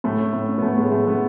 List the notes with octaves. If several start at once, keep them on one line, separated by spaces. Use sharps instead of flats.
A2 A3
C#4
A2
C#4
B3
A2 A3
A2 G#3
A2 A3
A2 B3